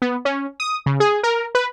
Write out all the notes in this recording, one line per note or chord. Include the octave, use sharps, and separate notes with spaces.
B3
C#4
D#6
C#3
G#4
A#4
B4